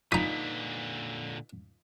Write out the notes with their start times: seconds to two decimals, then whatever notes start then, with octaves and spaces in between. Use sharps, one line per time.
0.12 A#2 D3 D#4 F4 B4 A#5 D#6 B6